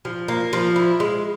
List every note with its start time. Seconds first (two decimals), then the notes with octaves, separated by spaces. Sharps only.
0.05 F3
0.28 A#3
0.53 F3
0.76 E4
1.00 G#3